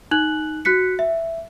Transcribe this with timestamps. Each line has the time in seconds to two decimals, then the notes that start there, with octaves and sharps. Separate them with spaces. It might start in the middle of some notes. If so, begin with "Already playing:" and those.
0.11 D#4 F#6 F#7
0.65 F#4 F#6 B6 C#7
0.99 E5